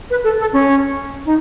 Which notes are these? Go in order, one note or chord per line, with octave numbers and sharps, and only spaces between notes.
B4
A4
A4
C#4
D#4